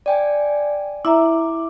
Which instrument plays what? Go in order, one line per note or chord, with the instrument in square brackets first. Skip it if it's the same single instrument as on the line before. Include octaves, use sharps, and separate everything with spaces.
[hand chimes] D5 G5 G#5
[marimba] E4 E5 A#5 [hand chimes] D6